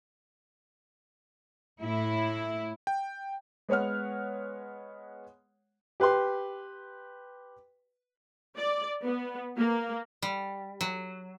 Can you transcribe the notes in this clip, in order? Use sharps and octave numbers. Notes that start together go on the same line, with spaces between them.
A2 E4
G5
G#3 B3 C#5 F#5 F6
G4 B4 G5 C6
D5
B3
A#3
G3
F#3